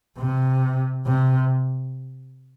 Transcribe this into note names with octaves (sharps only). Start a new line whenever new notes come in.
C3
C3